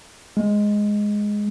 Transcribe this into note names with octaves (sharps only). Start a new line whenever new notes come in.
G#3